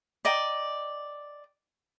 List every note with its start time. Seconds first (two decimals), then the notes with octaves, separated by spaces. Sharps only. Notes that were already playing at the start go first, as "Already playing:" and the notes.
0.25 D5 D#5 G5 A#5